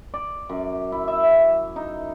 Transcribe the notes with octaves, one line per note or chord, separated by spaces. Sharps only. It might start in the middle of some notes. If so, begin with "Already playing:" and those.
D5
F#2
E4
E5
D#4